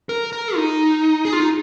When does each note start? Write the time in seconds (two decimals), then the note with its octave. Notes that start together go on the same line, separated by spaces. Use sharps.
0.09 A#4
0.33 A#4
0.56 D#4
1.25 G#4
1.33 F4
1.40 D#4